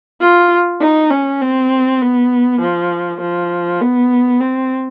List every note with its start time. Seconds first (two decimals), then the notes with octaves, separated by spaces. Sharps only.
0.21 F4
0.81 D#4
1.11 C#4
1.41 C4
2.01 B3
2.61 F3
3.21 F3
3.81 B3
4.41 C4